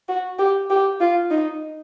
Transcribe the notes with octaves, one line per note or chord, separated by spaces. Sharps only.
F#4
G4
G4
F4
D#4